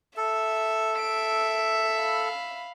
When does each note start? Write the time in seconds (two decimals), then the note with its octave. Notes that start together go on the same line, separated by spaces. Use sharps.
0.17 A4 E5
0.98 E5 D7
1.96 F5 B5